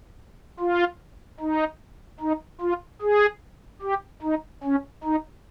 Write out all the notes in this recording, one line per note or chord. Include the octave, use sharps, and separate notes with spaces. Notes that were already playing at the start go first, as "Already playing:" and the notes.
F4
D#4
D#4
F4
G#4
G4
D#4
C#4
D#4